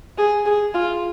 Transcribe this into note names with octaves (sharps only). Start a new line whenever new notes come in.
G#4
G#4
F4